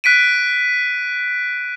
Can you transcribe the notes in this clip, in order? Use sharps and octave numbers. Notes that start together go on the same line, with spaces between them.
F#6 B6 D7 D#7